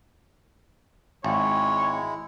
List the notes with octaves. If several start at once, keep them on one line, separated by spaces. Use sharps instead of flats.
G#1 G#3 E4 C#5